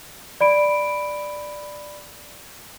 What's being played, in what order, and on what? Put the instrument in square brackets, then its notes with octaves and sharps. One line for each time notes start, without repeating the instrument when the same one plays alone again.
[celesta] D5 B5 D7